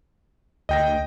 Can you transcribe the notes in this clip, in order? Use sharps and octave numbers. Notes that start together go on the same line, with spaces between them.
D2 D#5 G5 A#6